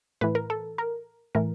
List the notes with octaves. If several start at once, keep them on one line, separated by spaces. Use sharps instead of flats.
A2 E3 B4
A#4
A4
A#4
A2 E3 A#4